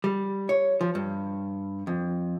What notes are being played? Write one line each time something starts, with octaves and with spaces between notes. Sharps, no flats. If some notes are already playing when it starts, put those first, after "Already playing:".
G3
C#5
F3
G2
F2